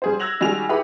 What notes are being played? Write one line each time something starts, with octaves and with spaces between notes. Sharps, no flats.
G3 G#4 C5
E6 F#6 G#6 A#6 F7 F#7
D#3 G3 G#3 F#4 G#5 F7
E4 G4 G#4 B4 F#5 B5